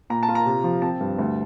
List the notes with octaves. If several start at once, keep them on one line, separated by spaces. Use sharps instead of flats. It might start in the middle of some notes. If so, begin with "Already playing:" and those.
A#2 A#5
A5
F4
A#5
C3
F3
C4 A5
G2
D2